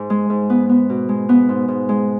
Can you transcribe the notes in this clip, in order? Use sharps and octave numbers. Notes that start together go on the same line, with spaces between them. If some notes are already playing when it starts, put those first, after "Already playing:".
Already playing: G#2
G#3
G#2
B3
B3
B2
G#3
B3
G#2
G#2
G#3